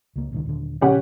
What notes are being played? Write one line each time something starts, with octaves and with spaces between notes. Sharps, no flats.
C#2 A#3
D#1 C#2 D#3
D#1 D3
A#2 C#3 F3 C#4 G4 F#5